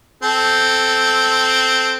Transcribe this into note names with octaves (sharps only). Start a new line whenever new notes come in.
C4 A4